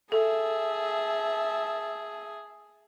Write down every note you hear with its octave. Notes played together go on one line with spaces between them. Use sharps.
G#4 A4 E5 A5